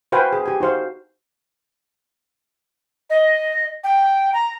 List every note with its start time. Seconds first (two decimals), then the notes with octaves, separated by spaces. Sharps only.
0.12 F#4 B4 C5 F5 G5 G#5
0.33 G#4
0.46 G4 G#5
0.60 D#4 F#4 C5 F5
3.10 D#5
3.84 G5
4.33 A#5